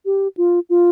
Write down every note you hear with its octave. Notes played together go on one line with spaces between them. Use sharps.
G4
F4
F4